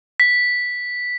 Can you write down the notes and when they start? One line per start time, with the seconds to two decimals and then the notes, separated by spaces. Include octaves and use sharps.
0.20 B6